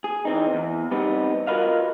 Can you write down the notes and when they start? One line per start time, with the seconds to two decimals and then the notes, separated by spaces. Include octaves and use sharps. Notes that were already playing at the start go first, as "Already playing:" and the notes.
0.04 G#4
0.25 E3 C4 D#4
0.54 E2
0.91 G3 B3 C4 D#4
1.47 F4 F#4 A#4 B4 D#5 F5